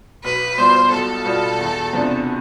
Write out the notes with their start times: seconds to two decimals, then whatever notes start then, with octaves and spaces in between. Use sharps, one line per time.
0.24 B1 B4
0.58 B2 G3 B3 F4 C5
0.92 B1 A4
1.25 B2 G3 B3 F4
1.59 E2
1.93 C3 F3 B3 D4